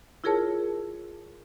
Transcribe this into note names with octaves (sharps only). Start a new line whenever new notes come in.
E4 F4 G#4 A#4 C#5 A5